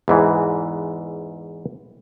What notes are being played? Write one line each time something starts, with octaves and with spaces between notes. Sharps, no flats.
E2 G#2 E3